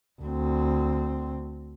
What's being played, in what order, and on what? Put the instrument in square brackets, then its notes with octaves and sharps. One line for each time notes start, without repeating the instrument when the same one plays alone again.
[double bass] D2 C4